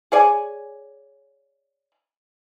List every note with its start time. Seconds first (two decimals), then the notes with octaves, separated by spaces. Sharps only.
0.12 G#4 C#5 D5 G#5